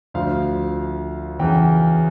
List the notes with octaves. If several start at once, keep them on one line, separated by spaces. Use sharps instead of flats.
D2 D3 F3 F5
E2 C#3 E3 G5